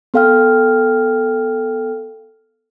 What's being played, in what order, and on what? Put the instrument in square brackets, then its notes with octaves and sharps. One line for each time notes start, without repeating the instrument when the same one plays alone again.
[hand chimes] B3 A4 F5 G5 F6